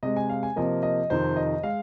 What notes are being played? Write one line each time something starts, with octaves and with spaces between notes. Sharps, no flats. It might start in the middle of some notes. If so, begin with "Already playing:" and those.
C3 G#3 D#5
G#5
F5
G#5
C3 F3 A#3 D#5
D#5
F2 C3 D#3 C5
D#5
G#3 F5